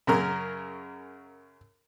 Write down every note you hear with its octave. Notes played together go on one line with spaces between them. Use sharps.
F#2 C#3 A#4